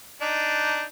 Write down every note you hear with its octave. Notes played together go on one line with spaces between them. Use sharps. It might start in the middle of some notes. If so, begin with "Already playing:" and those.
D4 D#4